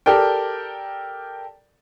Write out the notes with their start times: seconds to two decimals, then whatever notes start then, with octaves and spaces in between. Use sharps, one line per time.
0.06 G4 A4 A#4 D5 G5